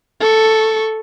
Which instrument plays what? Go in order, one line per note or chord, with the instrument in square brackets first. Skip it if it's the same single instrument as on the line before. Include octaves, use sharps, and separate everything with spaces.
[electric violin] A4 C#6